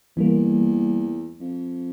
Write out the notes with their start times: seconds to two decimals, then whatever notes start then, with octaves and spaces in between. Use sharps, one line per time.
0.17 E2 E3 G3 A#3
1.40 F2